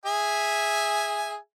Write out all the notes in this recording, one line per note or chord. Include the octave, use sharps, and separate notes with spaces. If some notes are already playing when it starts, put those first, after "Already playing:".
G#4 E5 G#5